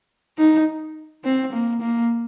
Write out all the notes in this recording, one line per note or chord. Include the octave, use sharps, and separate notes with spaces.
D#4
C4
A#3
A#3